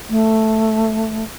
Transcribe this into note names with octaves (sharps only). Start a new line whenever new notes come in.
A3